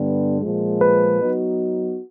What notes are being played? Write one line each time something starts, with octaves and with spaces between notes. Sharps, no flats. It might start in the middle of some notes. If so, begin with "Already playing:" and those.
Already playing: G2 D3 G3 B3
A#2 F3 G#3
B4
F#3 B3 D#4 F#4